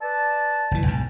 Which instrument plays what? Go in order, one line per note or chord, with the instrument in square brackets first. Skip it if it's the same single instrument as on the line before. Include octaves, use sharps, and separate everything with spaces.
[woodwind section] B4 D5 A5
[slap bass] F#1 E3
B1 G#2